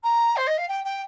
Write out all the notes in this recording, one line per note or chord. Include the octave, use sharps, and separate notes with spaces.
A#5
C5
D#5
F5
G5
G5